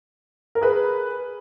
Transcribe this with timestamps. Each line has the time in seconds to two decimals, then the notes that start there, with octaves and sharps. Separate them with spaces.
0.55 A#4
0.61 G#4 B4